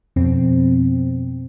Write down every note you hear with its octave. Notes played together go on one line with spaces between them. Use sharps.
F2 B2 C4